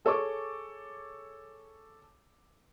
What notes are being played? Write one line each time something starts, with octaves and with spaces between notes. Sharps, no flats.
G#4 A4 C#5 C#6 D6